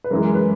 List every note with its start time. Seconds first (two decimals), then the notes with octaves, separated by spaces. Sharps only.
0.04 B4
0.11 F#2 E3 G#3 A#4
0.34 B4